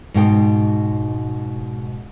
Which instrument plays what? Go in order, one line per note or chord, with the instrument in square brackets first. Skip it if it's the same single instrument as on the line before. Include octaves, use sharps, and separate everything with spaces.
[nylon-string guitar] G#2 B2 F#4 G5